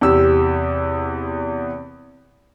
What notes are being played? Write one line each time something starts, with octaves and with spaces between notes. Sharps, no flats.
E2 C3 G4 E6